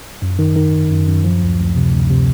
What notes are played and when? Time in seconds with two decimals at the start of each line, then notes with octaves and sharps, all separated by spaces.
0.22 F#2
0.39 D#3
0.56 D#3
0.74 G1
0.90 F#2
1.07 F#2
1.24 F3
1.42 D2
1.59 D2
1.76 C3
1.93 D2
2.10 C3